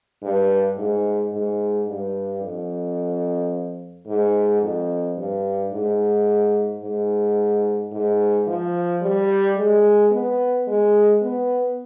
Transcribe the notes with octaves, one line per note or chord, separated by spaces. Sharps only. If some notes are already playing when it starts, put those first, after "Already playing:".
G2
G#2
G#2
G2
F2
G#2
F2
G2
G#2
G#2
G#2
F3
G3
G#3
B3
G#3
B3